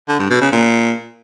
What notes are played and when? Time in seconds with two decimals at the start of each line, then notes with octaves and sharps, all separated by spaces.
0.08 D3
0.19 G2
0.30 B2
0.41 C#3
0.52 A#2